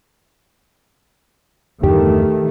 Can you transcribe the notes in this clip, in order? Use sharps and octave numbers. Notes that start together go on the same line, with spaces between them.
E2 G2 D3 D#3 A3 G4